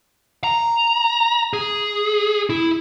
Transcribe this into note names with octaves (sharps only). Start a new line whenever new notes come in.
A#5
G#4
E4